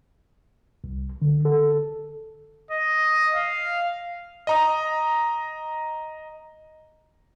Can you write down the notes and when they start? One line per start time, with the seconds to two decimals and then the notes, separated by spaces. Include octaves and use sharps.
0.84 C2
1.22 D3
1.45 A4
2.71 D#5
3.35 F5
4.47 D#5 A#5 D#6